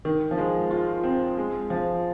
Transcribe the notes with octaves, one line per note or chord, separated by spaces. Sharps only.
D#3
F3
G#3
F4
C4
G#3
F3